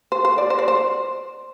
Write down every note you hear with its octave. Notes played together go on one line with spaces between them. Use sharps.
C5
C5
D5
C5
D5
C5